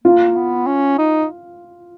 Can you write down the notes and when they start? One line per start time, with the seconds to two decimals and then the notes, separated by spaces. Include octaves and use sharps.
0.04 A#3 F4
0.36 B3
0.67 C#4
0.98 D#4